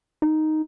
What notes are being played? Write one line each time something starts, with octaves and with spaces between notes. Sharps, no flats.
D#4